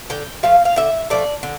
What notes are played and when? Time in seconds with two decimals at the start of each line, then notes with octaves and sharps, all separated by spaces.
0.10 D3 G5
0.43 F3 A3 F5
0.65 F5
0.76 D3 E5
1.10 F3 A3 D5
1.43 D3